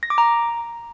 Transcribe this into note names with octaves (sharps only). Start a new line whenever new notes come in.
A#6
D6
A#5